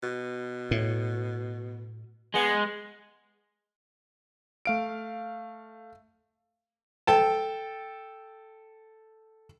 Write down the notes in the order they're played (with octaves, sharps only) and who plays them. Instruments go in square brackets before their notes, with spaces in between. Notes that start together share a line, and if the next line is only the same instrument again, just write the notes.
[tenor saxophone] B2
[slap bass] A2
[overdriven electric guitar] G#3 [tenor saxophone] B3
[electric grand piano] A3 F5 D7
[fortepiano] A4 G5 A5